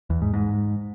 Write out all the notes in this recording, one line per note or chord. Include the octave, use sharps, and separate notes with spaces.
E2
G#2
G#2